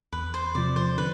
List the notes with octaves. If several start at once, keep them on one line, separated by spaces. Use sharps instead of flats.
E2 B4
C5
C3 F3 D5
C5
D3 B4